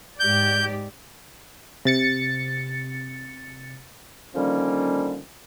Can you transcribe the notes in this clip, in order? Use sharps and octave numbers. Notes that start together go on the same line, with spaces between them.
G#2 G4 D5 G6
C3 A6 C#7
D3 D#3 F3 G3 A#3 C#4